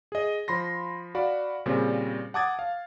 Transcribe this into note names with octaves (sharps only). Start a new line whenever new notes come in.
G#4 D#5
F3 B5 C6 A#6
F#4 D5 F5 B5
A#2 C#3 G3 C4
F#5 A5 D6 D#6 G#6 A6
F5